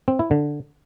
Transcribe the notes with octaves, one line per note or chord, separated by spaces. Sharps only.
C4
E4
D3